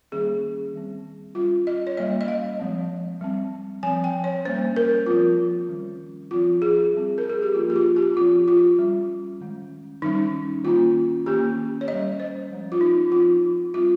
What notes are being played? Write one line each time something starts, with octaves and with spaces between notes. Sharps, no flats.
D#3 G3 A#3 C#4 G#4
D#3 G3 C4
G3 C#4 F4
D#5
C#5
G3 A#3 C#4 D#5
D#5
F5
F3 G#3 C4
G3 C4
F3 C4 G#5
G5
C#5
G3 A#3 C#4 C5
A#4
F3 C4 F4
D#3 G3 C#4
F3 C4 F4
G#4
G3 C4
A#4
G#4
G4
F3 A#3 C#4 F4
G4
F4
G4
F3 C4 F4
F4
G3 C#4
D#3 G#3 C#4
D#3 G3 C#4 D#4
D#3 A#3 C#4 F4
D#3 A#3 C#4 G4
C#5
G3 C#4 D#5
C5
F3 G#3 C#4
F4
D#4
F3 C4 F4
G3 C4 F4